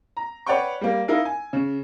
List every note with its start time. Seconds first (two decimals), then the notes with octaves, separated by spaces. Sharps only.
0.17 A#5
0.46 B4 C#5 D5 F#5 G5 C#6
0.81 G3 A#3
1.08 D#4 E4 A#4 F5
1.25 G#5
1.53 C#3